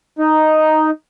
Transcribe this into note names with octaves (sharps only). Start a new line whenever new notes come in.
D#4